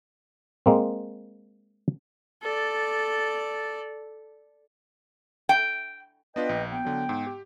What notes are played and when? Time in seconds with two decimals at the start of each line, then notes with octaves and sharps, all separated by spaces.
0.66 G#3 A#3 C4
2.43 A4 D5
5.49 G5
6.36 B3 D4 F4 B4 D#5 G5
6.49 A#1
6.71 B3 G5
6.85 D3 F#3
7.09 G#2
7.27 G4